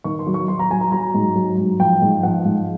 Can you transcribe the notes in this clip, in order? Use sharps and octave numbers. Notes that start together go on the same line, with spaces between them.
D#3 C#6
C6
F#3
C#6
F#3 C6
A#5
F#3 G#5
A#5
F#3 A#5
G#2
F#3
G#2
F3 G5
G#2
F3 F#5
G#2